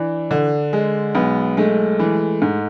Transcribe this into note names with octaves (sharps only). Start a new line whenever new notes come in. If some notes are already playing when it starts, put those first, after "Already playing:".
Already playing: E3 D4
D3
G#3
B1 B3
G#3 A3
E3
G#2